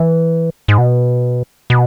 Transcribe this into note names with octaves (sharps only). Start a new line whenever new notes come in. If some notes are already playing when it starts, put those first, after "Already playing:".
Already playing: E3
G#2
B2
B2